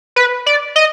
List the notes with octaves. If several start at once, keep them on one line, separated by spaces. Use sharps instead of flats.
B4
D5
D#5